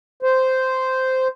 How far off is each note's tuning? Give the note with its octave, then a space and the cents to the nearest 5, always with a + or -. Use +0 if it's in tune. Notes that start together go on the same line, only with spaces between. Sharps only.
C5 -10